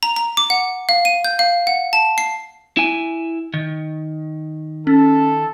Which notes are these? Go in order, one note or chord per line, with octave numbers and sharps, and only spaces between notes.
A#5
A#5
D6
F#5
F5
D#7
G6
F5
F#5
A5
C7
E4 G#5
D#3
C#4 A4